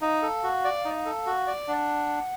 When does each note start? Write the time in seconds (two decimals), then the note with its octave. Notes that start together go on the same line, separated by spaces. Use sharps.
0.01 D#4 F5
0.22 A4
0.43 F#4
0.65 D5
0.85 D#4
1.05 A4
1.26 F#4
1.47 D5
1.68 D4 F#5